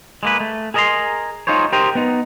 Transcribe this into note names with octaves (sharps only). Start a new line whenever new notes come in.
G#3 A#3 B4
A3
G#4 A#4 D#5 A5 A#5 C6
D#4 F4 G#4 C5 C#5
G4 A#4 C5 D#5
B3 D#4